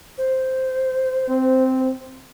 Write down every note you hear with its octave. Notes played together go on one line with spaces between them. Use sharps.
C5
C4